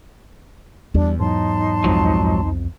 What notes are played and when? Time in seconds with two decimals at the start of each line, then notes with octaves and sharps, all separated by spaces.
0.94 E2 G3 D4
1.19 G#2 F#3 D#4 A5 C6
1.84 C2 F2 G#2 F3 F#3